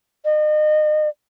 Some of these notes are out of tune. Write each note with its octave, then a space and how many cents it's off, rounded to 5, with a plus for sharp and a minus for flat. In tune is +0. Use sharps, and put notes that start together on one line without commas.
D#5 -35